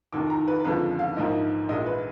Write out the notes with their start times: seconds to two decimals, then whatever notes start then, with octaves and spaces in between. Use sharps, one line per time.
0.12 F1 D#2 D#3 D6
0.30 A#5
0.48 B4
0.65 F#1 F2 D3 F3 G#3 B4
0.99 F5
1.17 A#1 G#2 F3 A#3 D#5
1.69 A#1 A#2 G#3 D#5
1.86 B4